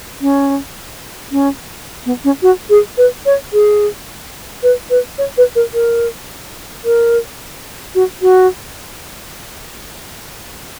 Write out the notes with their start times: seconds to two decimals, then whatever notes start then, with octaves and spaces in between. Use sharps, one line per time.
0.21 C#4
1.32 C#4
2.06 B3
2.24 C#4
2.42 F#4
2.70 G#4
2.98 B4
3.26 C#5
3.53 G#4
4.63 B4
4.90 B4
5.18 C#5
5.38 B4
5.55 A#4
5.74 A#4
6.85 A#4
7.95 F#4
8.22 F#4